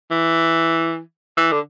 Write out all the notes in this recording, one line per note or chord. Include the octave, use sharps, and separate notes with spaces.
E3
E3
D3